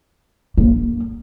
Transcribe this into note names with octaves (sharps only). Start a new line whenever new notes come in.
A#3